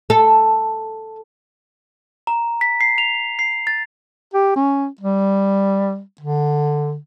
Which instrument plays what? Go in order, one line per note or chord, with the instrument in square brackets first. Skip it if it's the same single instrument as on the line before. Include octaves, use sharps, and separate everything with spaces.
[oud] A4
[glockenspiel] A#5
B6
C7
F7
C7
A6
[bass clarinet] G4
C#4
G3
D3